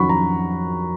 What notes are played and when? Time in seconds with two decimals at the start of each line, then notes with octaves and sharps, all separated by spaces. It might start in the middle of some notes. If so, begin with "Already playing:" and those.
Already playing: F2 D#3 F#3 C#4 F#5 B5 C#6
0.09 A#5